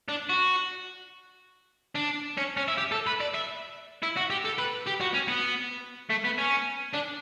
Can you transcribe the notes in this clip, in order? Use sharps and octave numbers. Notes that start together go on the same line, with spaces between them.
D4
F#4
D4
C#4
C#4
E4
G4
A4
B4
D5
E5
E4
F#4
G4
A4
B4
G4
F#4
C#4
B3
A3
B3
C#4
D4